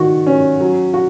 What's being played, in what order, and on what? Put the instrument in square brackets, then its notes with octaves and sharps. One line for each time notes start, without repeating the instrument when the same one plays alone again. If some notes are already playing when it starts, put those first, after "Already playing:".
Already playing: [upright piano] D#3 F#4
C#4
F#3
F#4